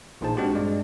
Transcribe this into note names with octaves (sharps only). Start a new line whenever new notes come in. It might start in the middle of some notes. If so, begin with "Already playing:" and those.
A1 A#2 D#4 G#4 C5 A5
G#3 C4 D4 F#4 G4
G2 G#3 D5